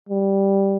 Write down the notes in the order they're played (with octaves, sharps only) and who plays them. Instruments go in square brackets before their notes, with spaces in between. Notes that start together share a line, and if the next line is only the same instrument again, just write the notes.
[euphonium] G3